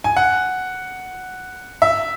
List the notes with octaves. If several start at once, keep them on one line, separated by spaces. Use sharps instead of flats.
G#5
F#5
E5